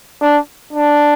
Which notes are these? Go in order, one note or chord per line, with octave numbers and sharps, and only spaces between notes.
D4
D4